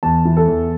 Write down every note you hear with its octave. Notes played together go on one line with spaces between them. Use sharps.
E2 A5
E3
A4
E2